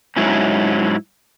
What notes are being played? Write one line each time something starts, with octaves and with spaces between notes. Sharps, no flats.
G#2 F#3 C#4 E4